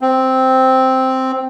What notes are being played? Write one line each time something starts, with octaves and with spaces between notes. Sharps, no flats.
C4